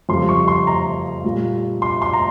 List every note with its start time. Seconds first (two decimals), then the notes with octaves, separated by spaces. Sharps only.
0.09 F2 C#3 G3 C6
0.29 C#6
0.48 C6
0.67 A#5
1.24 A#2 G3
1.82 C6
2.02 C6
2.13 A#5